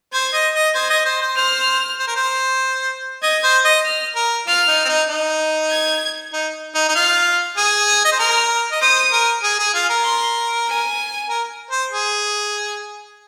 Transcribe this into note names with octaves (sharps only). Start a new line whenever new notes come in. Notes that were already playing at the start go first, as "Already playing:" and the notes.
C5 G#6
D#5
D#5
C5 G#6
D#5
C5
C5
C5 F6
C5
A#4
C5
D#5 G#6
C5
D#5
F6
A#4
F4 F6
D#4
C4
D#4
D#4
G#6
D#4
D#4
D#4
F4 F6
G#4 D#6
D#6
D#5
C5
A#4 F6
D#5
C5 D#6
A#4
G#4
G#4
F4
A#4
C6
G#5
A#4
C5
G#4